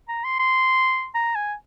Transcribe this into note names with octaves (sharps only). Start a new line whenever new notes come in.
A#5
C6
C6
A#5
G#5